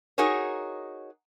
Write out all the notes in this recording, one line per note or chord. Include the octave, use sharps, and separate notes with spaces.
D#4 F#4 G#4 A#4 C#5